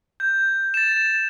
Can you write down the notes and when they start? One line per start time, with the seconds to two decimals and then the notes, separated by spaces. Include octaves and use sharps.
0.20 G6
0.74 A6 E7